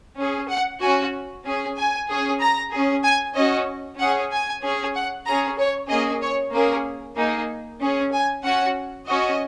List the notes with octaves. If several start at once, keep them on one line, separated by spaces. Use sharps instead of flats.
C#4 G#4
F#5
C#4 F#4 G#5
C#4 G#4
G#5
C#4 G#4
A#5
C#4 G#4
G#5
C#4 F#4 D#5
C#4 G#4 F#5
G#5
C#4 G#4
F#5
C#4 G#4 A#5
C#5
A#3 C#4 G#4 D#5
C#5
A#3 C#4 G#4 A#4
A#3 D#4 G#4
C#4 G#4
G#5
C#4 F#4 F#5
C#4 F#4 D#5